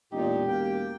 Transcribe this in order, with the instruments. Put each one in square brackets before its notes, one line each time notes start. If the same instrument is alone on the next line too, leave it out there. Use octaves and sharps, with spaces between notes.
[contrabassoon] E1 [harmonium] A#2 [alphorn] D#4 [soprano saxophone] G4
[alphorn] A#3 [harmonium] G5